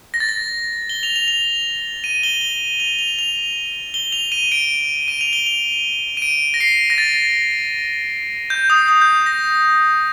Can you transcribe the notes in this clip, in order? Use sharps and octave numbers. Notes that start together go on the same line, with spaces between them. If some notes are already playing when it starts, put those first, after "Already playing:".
A#6
A6
A#6
G7
F7
F7
F7
D#7
G7
G7
F7
F7
F7
G7
F7
D#7
D7
D#7
F7
G7
F7
D#7
D7
A#6
C7
A#6
A6
G6
D#6
D#6
G6
A#6